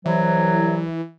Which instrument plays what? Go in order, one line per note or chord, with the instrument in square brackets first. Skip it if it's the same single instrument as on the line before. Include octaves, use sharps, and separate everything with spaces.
[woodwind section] C2 F#3 [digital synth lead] E3